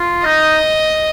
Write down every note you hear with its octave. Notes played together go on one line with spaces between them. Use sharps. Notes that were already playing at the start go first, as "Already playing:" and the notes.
Already playing: F4
D#4 D#5